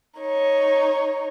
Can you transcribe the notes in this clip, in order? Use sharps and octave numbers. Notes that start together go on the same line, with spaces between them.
D#4 C#5